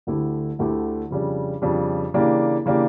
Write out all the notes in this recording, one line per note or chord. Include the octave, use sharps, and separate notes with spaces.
D2 D3 A3 E4 G4
D2 D3 A3 E4 G4
F2 C#3 G3 D4
F2 C#3 G3 D4
C#3 E3 A#3 D4 G4
C#3 E3 A#3 D4 G4